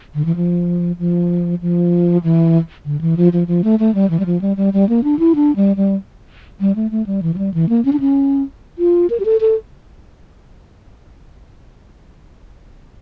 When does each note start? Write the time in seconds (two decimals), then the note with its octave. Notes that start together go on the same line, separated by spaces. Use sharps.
0.15 D3
0.25 E3
0.36 F3
0.99 F3
1.62 F3
2.23 E3
2.85 D3
3.01 E3
3.17 F3
3.33 F3
3.48 F3
3.64 A3
3.79 A3
3.95 G3
4.10 E3
4.20 G3
4.26 F3
4.42 G3
4.57 G3
4.73 G3
4.89 A#3
5.04 D4
5.19 E4
5.35 D4
5.56 G3
5.76 G3
6.61 G3
6.76 A3
6.91 A3
7.06 G3
7.23 E3
7.34 F3
7.38 G3
7.54 E3
7.69 A#3
7.85 C#4
7.93 D4
8.00 C#4
8.79 F4
9.10 A#4
9.20 G4
9.25 A4
9.41 A4